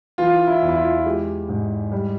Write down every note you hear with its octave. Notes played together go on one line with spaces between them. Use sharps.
E3 F4
E4
E2
E4
F4
F4
G#3 G4
G#2
G3